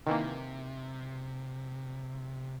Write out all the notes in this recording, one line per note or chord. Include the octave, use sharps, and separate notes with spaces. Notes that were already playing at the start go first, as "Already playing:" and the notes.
C3 D#3 E3 A#3